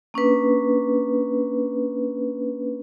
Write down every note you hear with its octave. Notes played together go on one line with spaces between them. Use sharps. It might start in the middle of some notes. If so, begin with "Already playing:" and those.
A#3 C#4 D4 B4